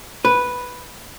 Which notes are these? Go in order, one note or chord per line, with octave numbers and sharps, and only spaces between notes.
B4